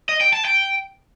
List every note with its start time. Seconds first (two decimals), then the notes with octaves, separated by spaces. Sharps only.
0.09 D#5
0.21 G5
0.33 A5
0.45 G5